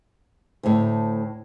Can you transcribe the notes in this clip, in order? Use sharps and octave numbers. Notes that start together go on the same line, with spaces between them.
D2 A2